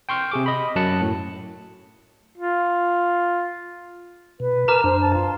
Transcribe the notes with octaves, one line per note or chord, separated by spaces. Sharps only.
G5 C6 C#6 F6 G6
C3 G#4 D6
D#5 B5
F#2 F#3 A5 F#6 C#7
A2
F4
B2 B4
A#4 A5 A#5 D6 F6
F#2 D4 C5
A5
F4